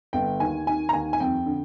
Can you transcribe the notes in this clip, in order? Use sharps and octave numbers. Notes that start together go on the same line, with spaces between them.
G1 G5
D#2 G#5
D#3 G#5
A#5
D#2 G#5
G#5
F2 G5
D3